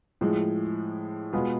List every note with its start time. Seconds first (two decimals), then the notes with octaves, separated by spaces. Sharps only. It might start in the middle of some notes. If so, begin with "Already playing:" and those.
0.21 A2 F3 G#3
1.33 B2 G#3 B3 F4 G#4